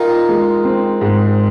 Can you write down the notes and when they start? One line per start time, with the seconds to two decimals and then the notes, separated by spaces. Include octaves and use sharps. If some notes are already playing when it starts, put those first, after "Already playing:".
Already playing: D#3 D#4 F4
0.29 G#3
0.65 C4
1.01 G#2